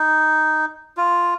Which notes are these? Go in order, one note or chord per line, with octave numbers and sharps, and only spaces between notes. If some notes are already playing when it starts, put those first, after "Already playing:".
Already playing: D#4
F4